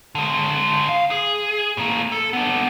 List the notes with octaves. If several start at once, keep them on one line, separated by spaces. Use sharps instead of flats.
D3 G#3
F5
G#4
A2 A#3
A4
B3 D4